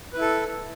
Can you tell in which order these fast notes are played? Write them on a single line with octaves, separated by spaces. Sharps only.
B4 E4 A4